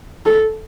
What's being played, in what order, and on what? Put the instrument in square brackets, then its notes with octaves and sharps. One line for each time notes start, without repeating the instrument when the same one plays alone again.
[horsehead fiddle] A4